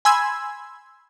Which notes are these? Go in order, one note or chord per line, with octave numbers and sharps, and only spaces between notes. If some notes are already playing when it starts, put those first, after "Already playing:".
G#5 B5 C6 E6 G#6